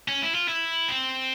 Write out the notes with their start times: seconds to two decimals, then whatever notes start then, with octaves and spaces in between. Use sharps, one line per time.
0.08 C#4
0.22 E4
0.35 F4
0.48 E4
0.88 C4